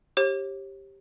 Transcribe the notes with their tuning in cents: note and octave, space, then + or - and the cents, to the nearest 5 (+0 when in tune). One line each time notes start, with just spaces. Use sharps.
G4 +0 C#5 -40